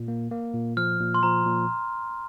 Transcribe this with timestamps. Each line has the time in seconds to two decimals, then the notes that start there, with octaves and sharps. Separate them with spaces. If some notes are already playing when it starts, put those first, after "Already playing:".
Already playing: A#2
0.08 A#3
0.31 A#3
0.54 A#2
0.77 F3 F6
1.00 A#2
1.14 C6
1.23 F3 A#5
1.46 A#2